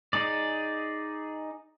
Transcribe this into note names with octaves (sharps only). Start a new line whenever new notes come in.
D#4 G#4 D5